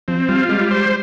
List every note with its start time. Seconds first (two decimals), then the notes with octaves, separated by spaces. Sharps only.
0.08 F3 C4
0.29 G3 F4
0.49 G3 G#3
0.71 C5